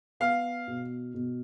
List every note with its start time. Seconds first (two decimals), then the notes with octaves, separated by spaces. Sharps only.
0.20 B3 F5
0.68 B2
1.14 B2